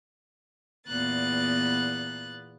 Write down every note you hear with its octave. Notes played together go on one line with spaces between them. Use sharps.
E2 A#2 B3 F#6 A6